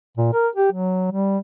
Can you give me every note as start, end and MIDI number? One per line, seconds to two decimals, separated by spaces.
0.17 0.29 46
0.33 0.48 70
0.56 0.71 67
0.72 1.09 54
1.12 1.38 55